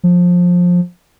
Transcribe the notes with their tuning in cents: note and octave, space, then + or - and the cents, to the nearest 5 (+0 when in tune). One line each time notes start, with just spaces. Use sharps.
F3 +20